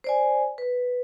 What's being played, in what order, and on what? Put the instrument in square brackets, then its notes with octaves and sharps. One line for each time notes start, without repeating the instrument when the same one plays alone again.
[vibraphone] C5 D5 G#5
B4